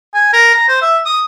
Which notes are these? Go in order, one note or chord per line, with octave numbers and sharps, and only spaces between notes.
G#5
A#4
A#5
C5
E5
D#6